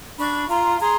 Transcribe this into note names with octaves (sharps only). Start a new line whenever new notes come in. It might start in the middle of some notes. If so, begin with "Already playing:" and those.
D4 B5 C#6
F4 A#5 C6
G#4 A#5 C6